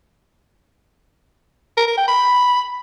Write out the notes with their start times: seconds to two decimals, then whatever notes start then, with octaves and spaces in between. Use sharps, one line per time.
1.77 A#4
1.88 A#4
1.98 G5
2.08 B5